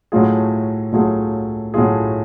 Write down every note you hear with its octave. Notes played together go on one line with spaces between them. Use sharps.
A2 F#3 A3 F4 G#4
A2 F#3 A3 F4 G#4
A2 F#3 A3 F4 G#4